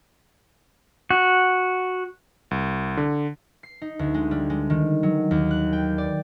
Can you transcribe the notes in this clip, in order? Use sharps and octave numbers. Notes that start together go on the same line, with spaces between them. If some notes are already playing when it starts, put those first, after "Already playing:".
F#4
C2
D3
C7
D#4
D2
G#3
G3
G#3
D#3
F#3
D#2
F#6
G5
D5